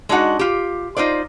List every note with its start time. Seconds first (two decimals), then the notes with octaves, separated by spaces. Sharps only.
0.09 G#3 D4 D#4 F#4 F#5
0.39 F4 G4
0.96 D#4 F4 C5 D5